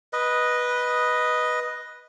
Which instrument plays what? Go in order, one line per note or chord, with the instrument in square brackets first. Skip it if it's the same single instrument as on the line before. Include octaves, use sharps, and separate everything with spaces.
[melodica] B4 D#5